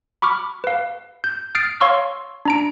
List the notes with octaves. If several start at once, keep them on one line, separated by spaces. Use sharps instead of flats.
B5 C#6 D6 F6
B4 F5
G6
D#6 F6 A6 C7 D7
C#5 F5 C6 C#6 E6 F6
D4 A#5 D7